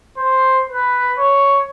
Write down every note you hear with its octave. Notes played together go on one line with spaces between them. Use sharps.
C5
B4
C#5